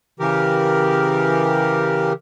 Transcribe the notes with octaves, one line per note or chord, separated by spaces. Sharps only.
C#3 E3 G4 A#4